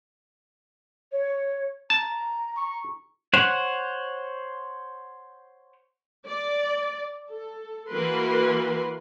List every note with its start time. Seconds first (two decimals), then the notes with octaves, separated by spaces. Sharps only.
1.12 C#5
1.90 A5 A#5
2.57 C#6
3.34 C5 C#5 F#5
6.27 D5
7.29 A4
7.88 E3 A#3 F#4 A#4 B4 C6